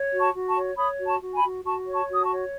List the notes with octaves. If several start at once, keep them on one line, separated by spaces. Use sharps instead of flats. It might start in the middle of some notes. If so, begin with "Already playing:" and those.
Already playing: C#5
F#4
A5 C#6
F#4
A5 C#6
C#5
C#5 B5 D#6
F#4
A5 C#6
F#4
G#5 B5
F#4
F#4 A5 C#6
C#5
A5 C#6
F#4
D#6
A5 C#6
C#5